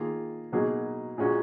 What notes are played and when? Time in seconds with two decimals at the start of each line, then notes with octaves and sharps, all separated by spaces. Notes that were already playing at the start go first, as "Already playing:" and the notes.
Already playing: D#3 A#3 F4 G#4
0.52 B2 F#3 A#3 D#4 G#4
1.18 A#2 G#3 C#4 F#4